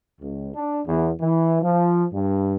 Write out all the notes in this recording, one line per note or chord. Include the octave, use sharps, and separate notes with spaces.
C#2
D4
E2
E3
F3
G2